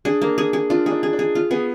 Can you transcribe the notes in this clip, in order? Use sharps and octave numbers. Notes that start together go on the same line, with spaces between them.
D4 G#4
A#3
G#4
G#4
D4 F4
D#4 G#4
D4
G#4
D4
G#4
F4
B3 G#4